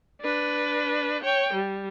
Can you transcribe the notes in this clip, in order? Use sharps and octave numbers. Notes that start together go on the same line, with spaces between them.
D4 B4
C#5 G5
G3